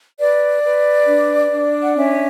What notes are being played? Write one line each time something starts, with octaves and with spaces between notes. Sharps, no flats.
B4 D5
B4
D4
D4
F#5
C#4 E5